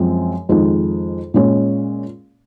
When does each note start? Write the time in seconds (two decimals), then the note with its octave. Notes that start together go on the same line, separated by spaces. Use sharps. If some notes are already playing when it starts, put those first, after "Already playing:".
Already playing: F#2 F3 G#3 C4
0.49 F2 D#3 G#3 D#4
1.34 A#2 G#3 C#4